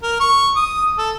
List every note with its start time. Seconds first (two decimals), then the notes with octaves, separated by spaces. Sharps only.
0.03 A#4
0.20 C#6
0.56 D#6
0.98 A4